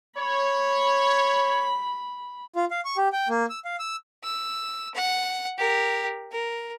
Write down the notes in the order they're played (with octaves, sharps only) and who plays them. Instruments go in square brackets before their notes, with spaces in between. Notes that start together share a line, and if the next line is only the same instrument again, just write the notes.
[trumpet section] C#5 [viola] B5
[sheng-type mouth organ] F4
F5
C#6
G4
G5
A#3
E6
F5
E6
[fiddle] E6
F#5
G4 A#4
A#4